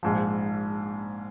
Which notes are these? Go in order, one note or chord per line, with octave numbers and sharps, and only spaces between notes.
A#1 G#2 F3